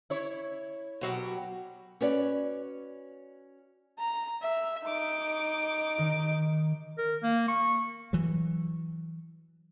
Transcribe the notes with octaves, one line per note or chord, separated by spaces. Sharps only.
E4 C#5
B2 F#3 G4
C#4 F#4 B4 C#5 D5
A#5
E5
D#4 D6
D#3
A#4
A#3
C#6
E3 F#3